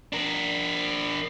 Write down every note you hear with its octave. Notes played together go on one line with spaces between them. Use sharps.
D4 A#4